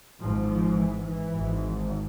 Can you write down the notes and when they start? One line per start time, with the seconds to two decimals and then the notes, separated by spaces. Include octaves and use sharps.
0.20 G#1 G#2 F3
0.49 F3
0.77 E3
1.05 E3
1.34 G#1 G#2